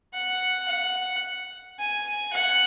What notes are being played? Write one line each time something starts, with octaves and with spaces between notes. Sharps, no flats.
F#5
F#5
G#5
F#5